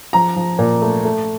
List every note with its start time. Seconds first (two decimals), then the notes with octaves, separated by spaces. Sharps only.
0.13 F3 A#5
0.36 F3
0.59 A#2
0.82 A3
1.05 A3